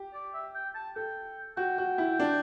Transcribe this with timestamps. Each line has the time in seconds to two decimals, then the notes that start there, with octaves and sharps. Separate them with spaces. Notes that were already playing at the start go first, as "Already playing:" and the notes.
Already playing: G4
0.14 D5
0.34 E5
0.55 G5
0.75 A5
0.96 A4 G5
1.57 F#4 G5
1.78 F#4
1.98 E4
2.20 D4